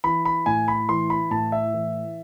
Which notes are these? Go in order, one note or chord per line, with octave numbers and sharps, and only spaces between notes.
E3 B5
B5
A2 G#5
B5
E3 C6
B5
A2 A5
E5
E3